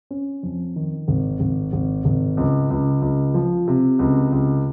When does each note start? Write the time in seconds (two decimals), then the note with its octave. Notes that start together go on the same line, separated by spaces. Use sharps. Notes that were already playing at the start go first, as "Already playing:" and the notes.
0.11 C#4
0.43 F2
0.76 D#3
1.08 G#1
1.40 G#1
1.73 G#1
2.05 G#1
2.37 C#2
2.70 C#2
3.02 C#2
3.34 F3
3.68 C3
3.99 C#2
4.32 C#2